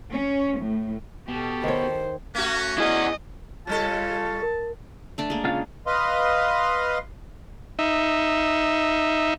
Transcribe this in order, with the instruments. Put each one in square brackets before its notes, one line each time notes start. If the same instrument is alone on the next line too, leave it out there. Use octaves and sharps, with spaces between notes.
[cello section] C#4
A2
[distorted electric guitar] B2 [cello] G4 A4
[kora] D#3 C#5 [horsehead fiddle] C5
[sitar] A3 F#4 [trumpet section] C#4
[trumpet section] C#4 [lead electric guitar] E4 G#4 [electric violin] D#5
[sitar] C#3 G3 A4 [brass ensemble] F4 [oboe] A5
[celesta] A#4
[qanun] A3 D4 D5
G#3 A#3
[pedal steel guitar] C#3 F4 F5
[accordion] B4 D#5 F5 C6
[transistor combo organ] D#4 E5